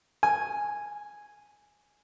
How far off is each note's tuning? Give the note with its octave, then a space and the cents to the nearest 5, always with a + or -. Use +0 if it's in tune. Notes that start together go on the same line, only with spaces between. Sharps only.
G#5 -5